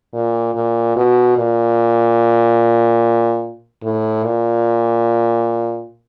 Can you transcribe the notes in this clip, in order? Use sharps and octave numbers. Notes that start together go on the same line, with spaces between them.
A#2
A#2
B2
A#2
A2
A#2